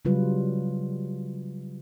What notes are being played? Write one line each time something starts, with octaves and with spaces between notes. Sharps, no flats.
C#3 F#3 G3 F4 B4